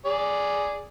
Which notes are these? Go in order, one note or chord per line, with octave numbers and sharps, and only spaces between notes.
G#4 D5